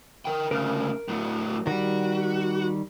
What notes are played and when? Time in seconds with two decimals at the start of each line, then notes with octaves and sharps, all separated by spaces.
0.25 A#4 G5
0.51 D2 C#3 A#4 F6
1.08 A2 F#3
1.67 D#3 G3 F#4